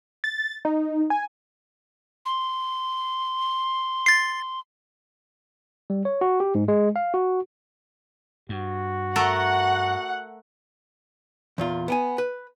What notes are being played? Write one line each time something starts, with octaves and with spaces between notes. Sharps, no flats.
A6
D#4
G#5
C6
A6 C7
G3
C#5
F#4
G4
G#2
G#3
F5
F#4
G2 F#4
A3 A4 A#4 F#5 F#6
E2 A#2 F4
B3 G5 G#5
B4